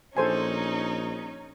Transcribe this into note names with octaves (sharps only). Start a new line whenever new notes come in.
A#1 C#4 D#4 A4 C5 G#5